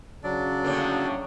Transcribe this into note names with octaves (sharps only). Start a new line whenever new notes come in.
C#3 F#3 D4 D5
A2 D3 A#3